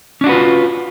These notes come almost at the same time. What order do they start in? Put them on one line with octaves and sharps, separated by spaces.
C#4 D4 F#4 B4 F4